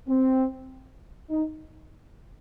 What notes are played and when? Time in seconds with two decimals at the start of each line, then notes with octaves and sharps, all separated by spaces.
0.08 C4
1.31 D#4